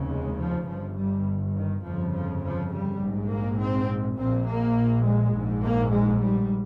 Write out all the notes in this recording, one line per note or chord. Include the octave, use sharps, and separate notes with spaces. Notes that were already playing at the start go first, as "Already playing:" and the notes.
Already playing: F1 D#2 C#3
G#3
F3
G1 G2 F3
G3
D#3
G1 F2 C#3 F3
F3
F3
G3
A#1 G#2
A#3
C4
A#1 A#2 C4
A#3
G#3
A#1 G#2
A#3
G#3
G3